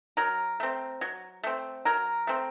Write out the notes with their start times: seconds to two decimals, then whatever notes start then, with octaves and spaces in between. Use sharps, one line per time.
0.17 F#3 A#4
0.60 A3 C4
1.01 F#3
1.44 A3 C4
1.85 F#3 A#4
2.27 A3 C4